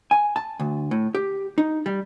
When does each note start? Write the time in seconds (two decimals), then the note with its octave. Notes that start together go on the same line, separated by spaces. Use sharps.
0.11 G#5
0.36 A5
0.60 D2
0.91 A2
1.15 G4
1.58 D#4
1.86 G3